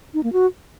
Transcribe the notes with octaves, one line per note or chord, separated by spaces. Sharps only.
D#4
A#3
F#4